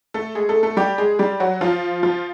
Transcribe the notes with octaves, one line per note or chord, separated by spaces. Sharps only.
A3 A4
G#3 G#4
A3 A4
A3 A4
G3 G4
G#3 G#4
G3 G4
F#3 F#4
F3 F4
F3 F4